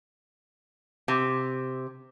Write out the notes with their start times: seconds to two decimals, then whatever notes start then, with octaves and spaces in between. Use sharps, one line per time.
1.08 C3